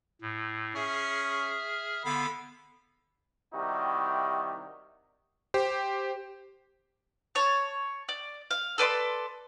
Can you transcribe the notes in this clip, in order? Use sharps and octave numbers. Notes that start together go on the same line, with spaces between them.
A2
C#4 G#4 E5 F6
D3 B3 F5 B5
C3 D#3 G3 D#4 E4 F#4
G4 C5
C#5 A5
D5
F5
A4 B4 D5 C6